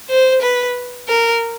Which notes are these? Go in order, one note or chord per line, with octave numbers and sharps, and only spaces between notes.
C5
B4
A#4